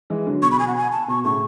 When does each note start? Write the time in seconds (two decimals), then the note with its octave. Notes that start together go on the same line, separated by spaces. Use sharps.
0.10 E3 G#3
0.27 D3 F#3
0.42 B2 C#6
0.51 B5
0.59 B2 G#5
0.68 F#5
0.76 G#5
0.92 A5
1.08 B2 C#6
1.24 A2 C#3 C#6